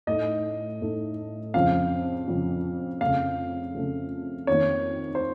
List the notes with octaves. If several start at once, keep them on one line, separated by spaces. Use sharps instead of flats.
A2 A3 D#4 D#5
A2 A3 D#4
F2 C#3 F3 F5
F2 C#3 F3
F2 C#3 A3 F5
F2 C#3 A3
F2 D#3 A#3 C#5
C5